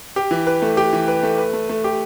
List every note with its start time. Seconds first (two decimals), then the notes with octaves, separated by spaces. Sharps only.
0.16 G4
0.31 E3
0.47 B4
0.62 A3
0.77 G4
0.93 E3
1.08 B4
1.23 A3
1.38 B4
1.53 A3
1.69 A3
1.84 G4